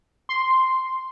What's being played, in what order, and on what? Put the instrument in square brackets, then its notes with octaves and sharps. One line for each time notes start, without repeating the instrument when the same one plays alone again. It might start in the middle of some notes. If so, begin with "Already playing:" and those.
[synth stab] C6